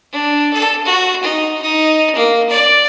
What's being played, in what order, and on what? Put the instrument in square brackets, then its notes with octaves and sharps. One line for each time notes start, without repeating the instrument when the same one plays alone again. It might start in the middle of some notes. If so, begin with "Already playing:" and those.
[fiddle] D4
A4
F#4
D#4
D#4
A#3
D5